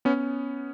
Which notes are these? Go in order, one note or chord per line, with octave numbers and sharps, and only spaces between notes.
B3 C#4